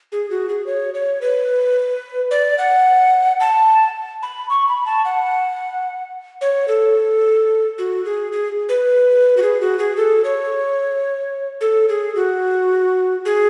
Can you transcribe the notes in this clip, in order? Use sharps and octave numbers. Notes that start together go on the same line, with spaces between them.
G#4
F#4
G#4
C#5
C#5
B4
D5
F#5
A5
B5
C#6
B5
A5
F#5
C#5
A4
F#4
G#4
G#4
B4
F#4
G#4
F#4
G#4
A4
C#5
A4
G#4
F#4
G#4